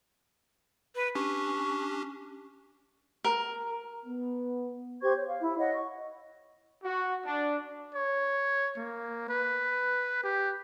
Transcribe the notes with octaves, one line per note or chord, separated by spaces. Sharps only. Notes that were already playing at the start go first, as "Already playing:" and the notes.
B4
C#4 D4 G4 C#6
A#4
B3
G4 C5 C#6 G#6
C#5
F5
E4
C#5 D#5 F#5
C#6
F#4
D4
C#5
A#3
B4
G4